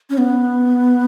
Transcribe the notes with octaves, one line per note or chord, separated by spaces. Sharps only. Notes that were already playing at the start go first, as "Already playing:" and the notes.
C#4
B3